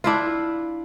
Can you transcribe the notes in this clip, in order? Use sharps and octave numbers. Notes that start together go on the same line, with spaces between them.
D4 E4 F4